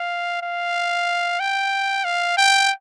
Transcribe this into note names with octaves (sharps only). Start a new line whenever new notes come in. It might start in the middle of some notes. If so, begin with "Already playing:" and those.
Already playing: F5
F5
G5
F5
G5